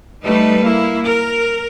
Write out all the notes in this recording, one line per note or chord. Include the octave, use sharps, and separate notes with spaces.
G3 A3 D#4 A4 B4
A#3 E4
A#4